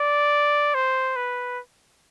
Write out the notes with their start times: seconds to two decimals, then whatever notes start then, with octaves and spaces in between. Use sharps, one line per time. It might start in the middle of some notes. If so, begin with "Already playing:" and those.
Already playing: D5
0.75 C5
1.16 B4